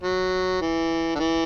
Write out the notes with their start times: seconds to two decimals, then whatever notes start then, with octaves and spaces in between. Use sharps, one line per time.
0.03 F#3
0.61 E3
1.15 D3
1.19 E3